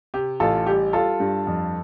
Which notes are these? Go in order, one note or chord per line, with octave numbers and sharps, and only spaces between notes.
C3 G4
A1 F4 A4
G3 G4
G3 F4 A4
G2
F2